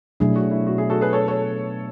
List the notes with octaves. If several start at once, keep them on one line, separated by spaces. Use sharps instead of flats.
B2 F#3 A3 D4 E4 G#4
F#4
E4
F#4
E4 G#4
F#4 A4
G#4 B4
A4 C#5
A4 C#5